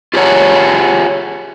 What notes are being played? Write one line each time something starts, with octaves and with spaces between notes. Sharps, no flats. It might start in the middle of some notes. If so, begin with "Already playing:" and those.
F4 G4 G#4 A#4 C#5 F#5